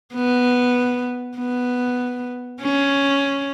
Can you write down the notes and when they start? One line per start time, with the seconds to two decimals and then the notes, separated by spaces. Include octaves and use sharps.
0.14 B3
1.38 B3
2.61 C#4